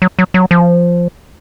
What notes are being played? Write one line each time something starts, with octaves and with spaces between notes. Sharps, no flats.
F#3
F#3
F#3
F3